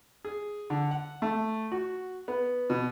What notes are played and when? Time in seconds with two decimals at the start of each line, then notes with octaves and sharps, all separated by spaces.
0.25 G#4
0.70 D3
0.91 F#5
1.22 A3
1.72 F#4
2.28 B3
2.70 B2